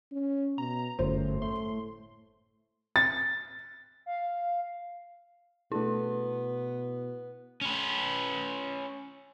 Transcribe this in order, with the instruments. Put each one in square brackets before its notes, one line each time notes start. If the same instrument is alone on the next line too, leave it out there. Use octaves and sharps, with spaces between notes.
[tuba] C#4
[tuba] B2 [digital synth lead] A#5
[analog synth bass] G1 [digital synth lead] F#2 [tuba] A2 [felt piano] C5
[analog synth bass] A3 [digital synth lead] C6
[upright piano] A6
[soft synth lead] F5
[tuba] B2 [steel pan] A3 D4 A4 [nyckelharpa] B3 [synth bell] E4
[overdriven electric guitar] C#4 B4